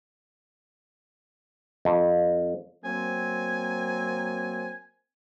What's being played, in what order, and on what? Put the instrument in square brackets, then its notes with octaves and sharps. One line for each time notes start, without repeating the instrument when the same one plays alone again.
[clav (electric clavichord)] F2
[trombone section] F#3 A#3 C4 [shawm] G#5